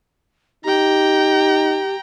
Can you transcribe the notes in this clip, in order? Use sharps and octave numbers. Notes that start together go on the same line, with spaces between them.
D#4 G4 G5 A#5